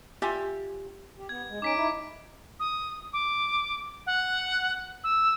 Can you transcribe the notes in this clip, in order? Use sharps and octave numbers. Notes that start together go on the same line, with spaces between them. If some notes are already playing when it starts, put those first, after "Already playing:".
F4 G4 D5 E5 G#5
G4
B3 G#6
G#3
C#4 D#4 D6 B6 D7
D#4 E4
D#6
D6
F#5
E6